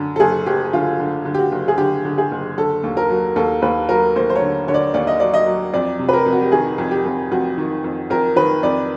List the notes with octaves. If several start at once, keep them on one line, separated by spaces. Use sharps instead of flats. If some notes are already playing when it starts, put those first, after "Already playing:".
Already playing: F#2 D3
A4
F#1 G#4
F#1 G4
D3 F4
D3
D3
G4
F#4
F#1
G#4
D3 G4
D3
G#4
F#1
D3 A4
D#2
A#4
F#3
D#2 A4
D#2 B4
F#3 A#4
D#2 C5
C5
C#5
D3
D3 C#5
D5
D#2 D5
D#5
F#3 D5
D#5
F#3
F2 D5
C3
B4
A#4
F2
F#4
G4
D#3 G#4
F2
G4
F2
F2 F#4
D#3
F2
F2 A#4
D#3 B4
F2 D5